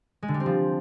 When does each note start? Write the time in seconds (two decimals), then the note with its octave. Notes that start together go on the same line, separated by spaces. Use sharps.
0.22 G#3
0.28 D3
0.34 G3
0.40 C4
0.46 F3